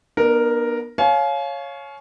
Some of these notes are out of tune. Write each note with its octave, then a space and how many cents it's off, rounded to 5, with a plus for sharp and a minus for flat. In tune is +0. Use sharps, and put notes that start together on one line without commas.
B3 -30 D4 +45 A#4 +0
C#5 +0 F5 +0 G#5 +40